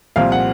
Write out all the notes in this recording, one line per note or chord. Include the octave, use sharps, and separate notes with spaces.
C2 A#2 F3 C4 F5
F#5